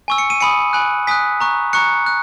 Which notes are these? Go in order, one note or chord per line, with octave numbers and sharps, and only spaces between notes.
G#5 C#6 E6
C#7
D#7
G#5 B5 D#6 C#7
G#5 B5 F#6
G#5 D#6 F#6 B6
A#5 C#6 F#6
A#5 C#6 F#6 C#7
F#6